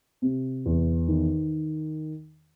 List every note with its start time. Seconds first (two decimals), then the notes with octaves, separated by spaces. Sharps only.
0.22 C3
0.66 E2
1.08 D#3